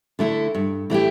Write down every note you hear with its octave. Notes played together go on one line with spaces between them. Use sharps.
D3 A3 E4 A4
G2
E3 A3 E4 G4